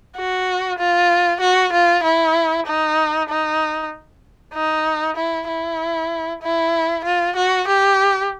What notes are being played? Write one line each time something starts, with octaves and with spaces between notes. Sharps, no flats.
F#4
F4
F#4
F4
E4
D#4
D#4
D#4
E4
E4
E4
F4
F#4
G4